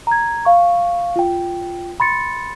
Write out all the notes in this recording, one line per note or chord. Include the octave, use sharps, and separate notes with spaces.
A#5 G#6
F5 C#6
F4 G5
B5 C6 A6 C#7